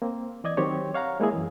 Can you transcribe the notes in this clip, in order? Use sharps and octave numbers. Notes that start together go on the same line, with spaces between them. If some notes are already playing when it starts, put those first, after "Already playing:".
A#3 C4
E3 D5 D#5 G#6
D#3 F#3 C4 G4 C#5
C#5 F5 F#5 A#5
G#3 A#3 E4 G#4
F#2 E3